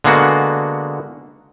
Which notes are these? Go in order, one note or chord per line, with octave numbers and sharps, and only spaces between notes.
D3 G#3 A#3 B3 F#4